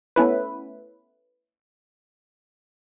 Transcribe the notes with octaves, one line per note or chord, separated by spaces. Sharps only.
A3 B3 C#4 E4 B4